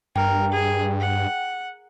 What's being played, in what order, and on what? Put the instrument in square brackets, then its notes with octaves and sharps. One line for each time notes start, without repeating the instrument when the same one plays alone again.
[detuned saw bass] G2 [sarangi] A#4 [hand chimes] G5
[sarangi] G#4
F#5